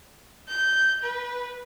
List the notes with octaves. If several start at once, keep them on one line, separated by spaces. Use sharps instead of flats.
G6
B4